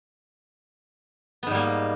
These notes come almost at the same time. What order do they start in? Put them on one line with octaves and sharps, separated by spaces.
B3 G#2 G3 A#3